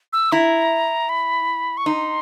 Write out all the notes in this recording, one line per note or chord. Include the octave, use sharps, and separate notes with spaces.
E6
E4 A#5
B5
C#6
D#4 C6